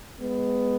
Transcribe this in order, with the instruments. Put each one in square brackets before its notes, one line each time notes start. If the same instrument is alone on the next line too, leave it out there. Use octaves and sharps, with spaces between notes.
[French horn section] G#3 B3